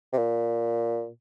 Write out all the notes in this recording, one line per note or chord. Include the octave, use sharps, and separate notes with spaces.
C3
A#2